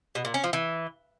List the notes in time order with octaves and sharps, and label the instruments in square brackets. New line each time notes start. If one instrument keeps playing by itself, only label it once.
[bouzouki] B2
A#2
C#4
F3
E3